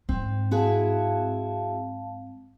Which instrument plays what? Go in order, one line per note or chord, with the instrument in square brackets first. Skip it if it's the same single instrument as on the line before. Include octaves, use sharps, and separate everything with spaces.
[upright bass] G#2 [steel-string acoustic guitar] C4
[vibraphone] C4 F5 A5 [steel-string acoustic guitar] E4 F#4 G#4